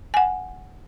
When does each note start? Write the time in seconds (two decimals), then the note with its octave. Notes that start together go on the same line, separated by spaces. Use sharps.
0.14 F#5 G#5